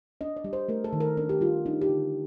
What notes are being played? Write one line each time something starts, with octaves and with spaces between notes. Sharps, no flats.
D4 D#5
D5
G3
C5
A3 A#4
A4
D#3
A#4
D4 A#4
G4
G3 F4
D4 D#4
G4
D3